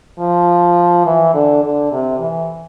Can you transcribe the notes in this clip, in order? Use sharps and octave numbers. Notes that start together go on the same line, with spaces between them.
F3
E3
D3
D3
C3
E3